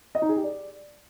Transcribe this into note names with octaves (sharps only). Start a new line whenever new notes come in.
D#5
D#4
G#4
G4
D5